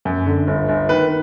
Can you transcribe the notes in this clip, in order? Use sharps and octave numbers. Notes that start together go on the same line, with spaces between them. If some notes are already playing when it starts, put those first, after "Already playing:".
F#2
D3
G1
G1
D#3 B4